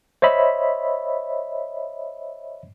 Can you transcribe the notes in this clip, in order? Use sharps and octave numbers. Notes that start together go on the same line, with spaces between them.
C5 C#5 D#5 E5 B5